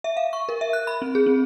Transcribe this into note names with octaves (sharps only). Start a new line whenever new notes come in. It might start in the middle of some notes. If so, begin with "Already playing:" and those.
E5
F5
C#6
A#4
E5
F#6
B5
C4
G#4
C4